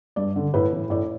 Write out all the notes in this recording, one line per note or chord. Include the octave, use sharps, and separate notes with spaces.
G2 D5
D3
A2 B4
E3
A2 D5